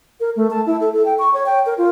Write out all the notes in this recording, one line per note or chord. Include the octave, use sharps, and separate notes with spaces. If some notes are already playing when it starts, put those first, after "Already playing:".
A#4
A3
A5
E4
A4
A4
G5
C#6
C#5
G5
A#4
F4